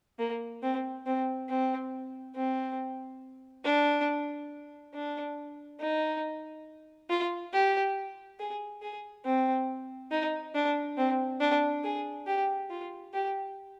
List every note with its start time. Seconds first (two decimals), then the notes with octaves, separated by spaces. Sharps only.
0.19 A#3
0.63 C4
1.06 C4
1.49 C4
2.36 C4
3.65 D4
4.94 D4
5.80 D#4
7.10 F4
7.53 G4
8.39 G#4
8.82 G#4
9.25 C4
10.11 D#4
10.55 D4
10.97 C4
11.41 D4
11.84 G#4
12.27 G4
12.70 F4
13.14 G4